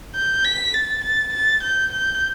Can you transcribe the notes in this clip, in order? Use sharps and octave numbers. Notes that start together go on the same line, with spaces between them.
G6
B6
A6
A6
A6
G6
G6